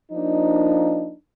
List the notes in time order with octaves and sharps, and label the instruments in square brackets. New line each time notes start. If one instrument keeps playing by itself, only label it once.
[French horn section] F3 A#3 D4 D#4